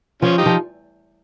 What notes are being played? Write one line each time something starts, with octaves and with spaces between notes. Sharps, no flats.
F3 C#4 F4
D#4 G4
F3